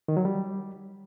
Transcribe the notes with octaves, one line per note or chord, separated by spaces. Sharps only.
D#3
F#3
G3